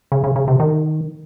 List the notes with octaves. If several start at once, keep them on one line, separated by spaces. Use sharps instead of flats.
C#3
C#3
C#3
C3
D#3